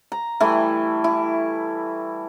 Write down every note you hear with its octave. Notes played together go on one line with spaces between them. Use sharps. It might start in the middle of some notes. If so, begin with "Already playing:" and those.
A#5
E3 G3 A3 E4
E4